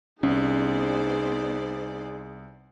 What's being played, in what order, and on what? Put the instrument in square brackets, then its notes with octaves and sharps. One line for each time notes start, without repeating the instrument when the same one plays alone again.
[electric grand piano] C2 [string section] B3 C5 D5 [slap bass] C#4 [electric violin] D#4 G#4